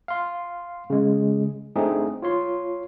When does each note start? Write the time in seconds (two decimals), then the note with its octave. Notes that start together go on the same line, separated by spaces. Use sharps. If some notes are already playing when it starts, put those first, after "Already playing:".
0.08 F5 C6
0.90 C#3 G#3
1.76 A3 C4 D4 D#4 G#4
2.22 F4 C#5 C6